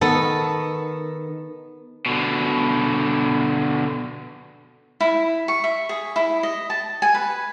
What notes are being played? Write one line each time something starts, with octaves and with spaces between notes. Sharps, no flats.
D#3 B3 A4
B2 D3
E4
C#6
E5
G#4
E4
D#5
A5
G#5
B4